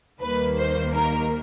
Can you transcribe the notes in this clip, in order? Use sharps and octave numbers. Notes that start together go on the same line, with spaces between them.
D#2 D#3 G3 A#3 B4
C5
A#4